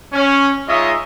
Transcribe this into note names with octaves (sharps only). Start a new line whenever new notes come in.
C#4
G#3 D#4 F4 C#5 D#5 E5